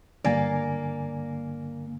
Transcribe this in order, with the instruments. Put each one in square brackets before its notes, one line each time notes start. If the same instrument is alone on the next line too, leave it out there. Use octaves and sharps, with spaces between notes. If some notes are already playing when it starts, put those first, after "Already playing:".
[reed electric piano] G2 D3 G#5 [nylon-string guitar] A#3 D5